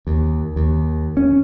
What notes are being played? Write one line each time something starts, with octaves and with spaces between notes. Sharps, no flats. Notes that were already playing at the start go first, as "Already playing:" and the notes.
D#2
D#2
C#4